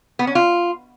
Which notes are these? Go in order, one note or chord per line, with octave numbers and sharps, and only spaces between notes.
B3
C#4
F4